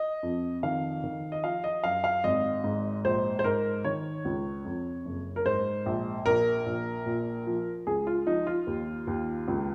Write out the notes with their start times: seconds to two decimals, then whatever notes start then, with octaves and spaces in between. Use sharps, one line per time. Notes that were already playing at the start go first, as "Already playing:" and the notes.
Already playing: D#5
0.23 F2
0.63 D#3 F5
1.04 D#3
1.32 D#5
1.44 F3 F5
1.64 D#5
1.84 F#2 F5
2.04 F5
2.24 G#1 D#5
2.64 G#2
3.05 A#1 C5
3.39 C5
3.44 G#2 A#4
3.85 D#3 C#5
4.25 C#2
4.65 F2
5.05 F#1
5.36 A#4
5.46 G#2 C5
5.86 A#1
6.26 A#1 A#4
6.66 A#1
7.06 A#2
7.47 F3
7.87 C#2 G#4
8.07 F4
8.26 F3 D#4
8.47 F4
8.67 D#2
9.07 D#2
9.48 C#2